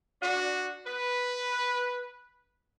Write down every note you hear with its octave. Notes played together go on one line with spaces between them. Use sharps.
D4 F#4
B4